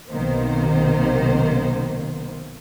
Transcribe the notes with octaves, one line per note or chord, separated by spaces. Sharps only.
B1 C3 D#3 A#3 B3 C5